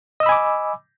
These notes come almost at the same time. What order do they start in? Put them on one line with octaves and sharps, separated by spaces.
D#5 E6 B5 G#5 D6